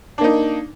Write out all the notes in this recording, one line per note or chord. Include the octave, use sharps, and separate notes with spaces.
A#3 D4 D#4